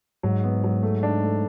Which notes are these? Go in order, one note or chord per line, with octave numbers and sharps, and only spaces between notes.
G#2 F#3
B3
F#3
A3
D4
A3